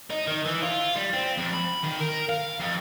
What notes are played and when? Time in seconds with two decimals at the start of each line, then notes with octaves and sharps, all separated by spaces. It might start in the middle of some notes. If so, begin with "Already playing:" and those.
0.10 D#4
0.28 D#3
0.46 E3
0.63 F4
0.96 G3
1.14 C4
1.38 F2
1.53 B5
1.83 D#3
2.00 A#4
2.29 F5
2.61 F2